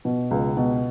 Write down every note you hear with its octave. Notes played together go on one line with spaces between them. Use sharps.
B2
C#2
B2